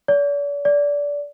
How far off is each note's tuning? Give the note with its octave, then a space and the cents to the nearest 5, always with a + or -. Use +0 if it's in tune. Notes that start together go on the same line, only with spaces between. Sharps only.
D5 -45
D5 -20